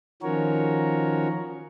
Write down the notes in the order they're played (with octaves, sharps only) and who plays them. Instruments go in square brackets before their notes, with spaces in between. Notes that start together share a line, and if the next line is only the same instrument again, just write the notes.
[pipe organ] D#3 F3 C#4 F#4 A#4 C#5